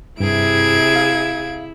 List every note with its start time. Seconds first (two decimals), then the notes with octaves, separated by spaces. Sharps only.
0.20 G2 C3 E4 G#4 G#6 D7
0.96 F5